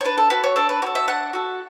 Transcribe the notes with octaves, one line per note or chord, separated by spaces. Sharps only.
C#5
D4 B4
A4
F#4 A4 B4
C#5
D4 A4
B4
F#4 A4 C#5
E5
D4 F#5
F#4 A4